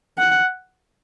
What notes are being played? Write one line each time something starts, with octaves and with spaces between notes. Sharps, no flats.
F#5